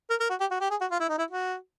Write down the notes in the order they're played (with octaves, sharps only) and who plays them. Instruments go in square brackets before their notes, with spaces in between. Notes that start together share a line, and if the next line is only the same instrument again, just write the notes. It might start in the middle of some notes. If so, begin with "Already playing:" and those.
[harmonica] A#4
A#4
F#4
G4
F#4
G4
G#4
F#4
F4
E4
D#4
E4
F#4